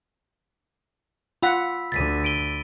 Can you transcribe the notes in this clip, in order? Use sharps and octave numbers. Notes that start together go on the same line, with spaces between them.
F4 F#5 B5 E6 B6
D2 D3 A6 B6 D#7
D7 D#7 G7